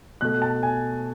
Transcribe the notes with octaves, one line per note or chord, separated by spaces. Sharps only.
B2 A3 F#6
A5
G#5